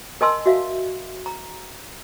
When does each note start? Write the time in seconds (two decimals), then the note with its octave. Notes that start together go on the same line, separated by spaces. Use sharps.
0.21 A#4 D#5 G#5 A5 C6 E6
0.46 F#4 E5 F5
1.26 A#5